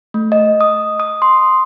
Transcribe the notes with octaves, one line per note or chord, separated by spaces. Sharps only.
A3
D#5
D#6
D#6
C6